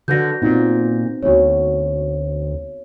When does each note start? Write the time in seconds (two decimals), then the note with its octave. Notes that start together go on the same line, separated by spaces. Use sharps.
0.08 D3 F#4 B4 F#5 G6 A#6
0.42 A#2 B3 C4 D#4
1.23 D2 B3 F#4 C#5